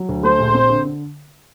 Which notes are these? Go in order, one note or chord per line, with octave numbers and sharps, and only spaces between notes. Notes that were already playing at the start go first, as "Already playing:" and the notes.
Already playing: F#3
D2
A3 C5
A#1
C4
D3
D3